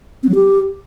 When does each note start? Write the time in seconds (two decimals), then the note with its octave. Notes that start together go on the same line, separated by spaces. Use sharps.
0.23 C4
0.29 F#3
0.35 G4